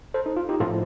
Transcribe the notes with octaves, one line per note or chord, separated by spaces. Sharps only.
A4 C5
D#4
F4
D#4 G4
A2 F3 F4 A4